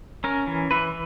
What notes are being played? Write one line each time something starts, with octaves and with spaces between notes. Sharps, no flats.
C#4 A#4
E3
E3 B4